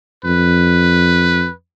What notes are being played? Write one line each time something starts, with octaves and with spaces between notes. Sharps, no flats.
F2 B4